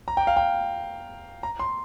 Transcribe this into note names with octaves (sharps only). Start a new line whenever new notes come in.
A#5
G5
F5
G5
A#5
C6